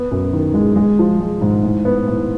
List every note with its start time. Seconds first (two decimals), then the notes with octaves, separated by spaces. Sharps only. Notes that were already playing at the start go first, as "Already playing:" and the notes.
Already playing: B3
0.11 F#2
0.33 D#3
0.54 G#3
0.76 G#3
0.99 F3
1.20 G#3
1.41 G#2
1.63 A2
1.85 B3
2.08 A2